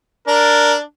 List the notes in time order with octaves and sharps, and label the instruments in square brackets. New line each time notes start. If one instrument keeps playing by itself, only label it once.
[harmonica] D4 [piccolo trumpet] A#4